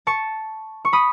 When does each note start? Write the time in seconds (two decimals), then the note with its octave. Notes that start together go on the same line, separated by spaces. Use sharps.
0.07 A5 C#6
0.85 C#6
0.93 B5 D#6